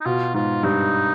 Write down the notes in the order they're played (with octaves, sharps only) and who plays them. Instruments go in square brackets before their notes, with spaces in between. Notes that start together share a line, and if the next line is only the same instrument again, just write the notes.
[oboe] D#4
[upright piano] B2 [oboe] F4
[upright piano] G#2 [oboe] F4
[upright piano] G2 [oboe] D#4